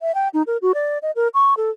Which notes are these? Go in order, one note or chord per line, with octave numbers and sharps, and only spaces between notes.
E5
G5
D#4
A#4
F#4
D5
D#5
A#4
C#6
A4